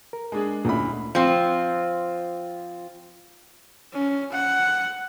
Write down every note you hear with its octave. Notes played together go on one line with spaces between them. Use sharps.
A#4
G#3 D4 G#4
D2 A#2 C#4 E4 D#5 B5
F3 C4
C#4
F#5